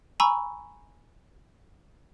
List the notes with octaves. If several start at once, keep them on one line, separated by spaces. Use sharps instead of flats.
G#5 A#5 B5 C#6 E6